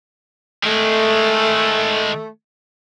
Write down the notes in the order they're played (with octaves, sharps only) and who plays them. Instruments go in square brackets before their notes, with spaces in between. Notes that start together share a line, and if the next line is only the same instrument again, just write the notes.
[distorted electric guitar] D#3 G#3 [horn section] A3